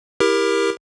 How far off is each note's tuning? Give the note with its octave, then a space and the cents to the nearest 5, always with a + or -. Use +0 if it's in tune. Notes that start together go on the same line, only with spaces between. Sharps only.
E4 +0 G4 +25 A#4 +15